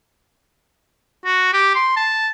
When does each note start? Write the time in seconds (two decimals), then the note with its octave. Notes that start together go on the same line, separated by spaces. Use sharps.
1.25 F#4
1.53 G4
1.75 C6
1.97 A5